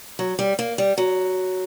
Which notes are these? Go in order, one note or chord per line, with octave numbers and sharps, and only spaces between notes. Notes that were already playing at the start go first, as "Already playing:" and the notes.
F#3
G3
A#3
G3
F#3